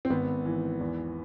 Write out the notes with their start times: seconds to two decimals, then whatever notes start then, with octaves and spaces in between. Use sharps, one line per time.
0.05 C4
0.10 G#1 B3
0.45 E3
0.80 E2